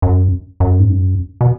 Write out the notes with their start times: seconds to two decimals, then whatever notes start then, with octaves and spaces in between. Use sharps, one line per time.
0.02 F#2
0.60 F#2
0.79 G#2
0.89 F#2
1.41 B2